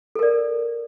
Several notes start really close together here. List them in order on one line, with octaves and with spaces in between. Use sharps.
A4 A#4 D5